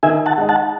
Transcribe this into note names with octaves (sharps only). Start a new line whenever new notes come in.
D#3 E5 G#5
F#5 A5
G#3 D#4
F#5 A5